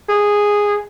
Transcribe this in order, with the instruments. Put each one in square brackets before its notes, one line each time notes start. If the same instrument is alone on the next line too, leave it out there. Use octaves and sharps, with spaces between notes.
[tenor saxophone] G#4